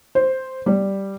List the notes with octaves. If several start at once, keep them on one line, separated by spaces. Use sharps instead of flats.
C5
G3